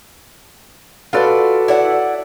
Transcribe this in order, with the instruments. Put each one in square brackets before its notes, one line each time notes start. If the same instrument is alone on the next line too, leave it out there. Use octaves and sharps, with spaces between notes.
[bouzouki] F4 D5 [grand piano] F#4 A4 B4
[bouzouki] E4 D5 F#5